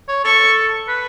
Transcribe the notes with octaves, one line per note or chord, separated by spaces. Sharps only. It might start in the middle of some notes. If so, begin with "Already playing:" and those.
C#5
A4 C#6
B4